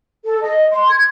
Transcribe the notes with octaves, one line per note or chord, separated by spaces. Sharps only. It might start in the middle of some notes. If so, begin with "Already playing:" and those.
A4
D#5
C6
G#6